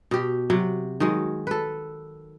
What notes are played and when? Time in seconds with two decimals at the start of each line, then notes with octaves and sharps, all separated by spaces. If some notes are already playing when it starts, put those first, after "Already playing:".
0.11 B2 G4
0.50 C3 F#3
1.00 D#3 F#3 G#3
1.47 A4 B4